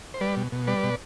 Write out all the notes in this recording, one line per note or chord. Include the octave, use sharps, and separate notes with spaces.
C5
G3 B4 D5
B2
B2
G3 B4 D5
B2